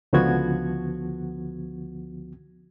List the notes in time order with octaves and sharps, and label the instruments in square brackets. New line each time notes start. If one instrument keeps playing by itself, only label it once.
[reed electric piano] C#2 D3 F3 B3 F#4 G#6